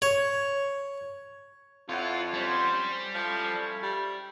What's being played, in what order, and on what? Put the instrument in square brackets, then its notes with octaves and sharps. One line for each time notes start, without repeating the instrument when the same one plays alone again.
[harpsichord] C#5
[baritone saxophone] F2 [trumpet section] E4 C#5 F#5 [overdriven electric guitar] F4
[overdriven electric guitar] G3 [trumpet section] C#4 C5
[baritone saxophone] F3 [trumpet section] C#4 E4 A4
[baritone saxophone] G3